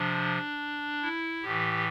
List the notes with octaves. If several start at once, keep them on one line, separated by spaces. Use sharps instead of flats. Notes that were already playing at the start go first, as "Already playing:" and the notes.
Already playing: C3 F3 D4
E4
A2 E3 G4